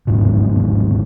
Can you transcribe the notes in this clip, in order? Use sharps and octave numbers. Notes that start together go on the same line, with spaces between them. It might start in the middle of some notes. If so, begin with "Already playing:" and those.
G1 D#2 G#2 B2